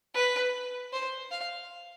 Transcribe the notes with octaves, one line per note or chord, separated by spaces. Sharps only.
B4
C5
F5